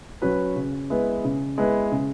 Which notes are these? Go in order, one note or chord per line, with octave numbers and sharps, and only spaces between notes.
F#3 C#4 F#4 B4
C#3
G#3 B3 E4 B4
C#3
G#3 B3 E4 B4
C#3